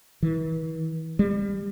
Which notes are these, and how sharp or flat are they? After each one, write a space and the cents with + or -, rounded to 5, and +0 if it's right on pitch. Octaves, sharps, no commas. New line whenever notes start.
E3 -40
G3 +30